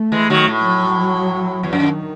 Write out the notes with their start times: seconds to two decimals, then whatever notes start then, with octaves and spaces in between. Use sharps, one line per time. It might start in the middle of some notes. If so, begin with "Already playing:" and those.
Already playing: A3
0.12 E3 G#3
0.30 D#3 F#3
0.48 A2
0.66 F#3
1.63 E2
1.72 F#2 D#3